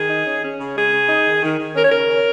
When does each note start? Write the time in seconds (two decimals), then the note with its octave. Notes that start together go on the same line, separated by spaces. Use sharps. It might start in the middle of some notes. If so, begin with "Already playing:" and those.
Already playing: D#3 G#4
0.09 D#4
0.25 C#4
0.43 C#4
0.59 C#3
0.76 G#3 G#4
0.92 C#3
1.08 D#4
1.25 D#3
1.42 D#3
1.58 D#3
1.74 C#4 A#4
1.82 C#5
1.90 C#3 A#4
2.08 C#4